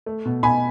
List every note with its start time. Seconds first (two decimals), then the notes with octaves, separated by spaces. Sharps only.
0.06 A3
0.25 B2
0.43 B2 G#5 B5